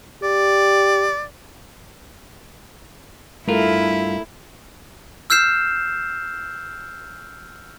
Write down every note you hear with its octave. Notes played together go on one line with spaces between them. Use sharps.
G4 D5
G2 A3 E4 F4 A#4
E6 F6 G6 C7 E7